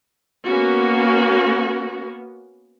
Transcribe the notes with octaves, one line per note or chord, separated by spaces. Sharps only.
A#3 B3 C#4 F#4